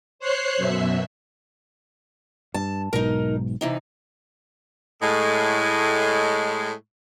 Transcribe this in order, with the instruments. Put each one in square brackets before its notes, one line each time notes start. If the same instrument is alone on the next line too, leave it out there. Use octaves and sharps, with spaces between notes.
[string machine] C5 C#5 F#6 C7
F#2 B2 E5
[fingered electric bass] G2 [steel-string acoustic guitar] A5
[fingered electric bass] B1 G#2 B2 [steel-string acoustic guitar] D#4 A#4
[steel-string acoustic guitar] C3 E3 D#4
[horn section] A2 G#3